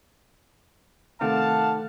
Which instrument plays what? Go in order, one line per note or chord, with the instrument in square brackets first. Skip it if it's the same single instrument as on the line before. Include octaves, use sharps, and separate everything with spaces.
[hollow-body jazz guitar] C3 D#3 [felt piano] A3 [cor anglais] F5 [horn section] F#5 A5